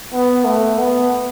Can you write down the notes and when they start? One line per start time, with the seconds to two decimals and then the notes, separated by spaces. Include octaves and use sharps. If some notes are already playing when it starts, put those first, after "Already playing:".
0.12 B3
0.45 A3
0.77 B3